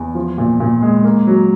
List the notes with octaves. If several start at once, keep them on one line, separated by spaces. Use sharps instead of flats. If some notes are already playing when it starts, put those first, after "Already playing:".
Already playing: E2
F3
A#2
A#2
G#3
A#3
F#3